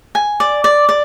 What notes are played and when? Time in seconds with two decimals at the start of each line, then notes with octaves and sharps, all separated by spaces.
0.15 G#5
0.40 D5
0.64 D5
0.89 D5